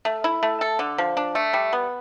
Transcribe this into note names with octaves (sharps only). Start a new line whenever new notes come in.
A3
E4
A3
A4
D3
F3
D4
A3
G3
B3